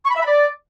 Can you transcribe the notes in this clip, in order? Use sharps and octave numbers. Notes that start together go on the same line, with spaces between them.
C#6
B5
E5
B5
D5